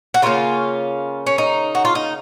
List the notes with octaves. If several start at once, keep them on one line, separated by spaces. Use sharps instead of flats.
F#4
C#3 F#3 A#3 C#4 F4
C#4
D#4
F#4
F4
D#4